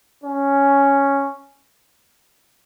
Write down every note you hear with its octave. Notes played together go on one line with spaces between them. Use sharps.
C#4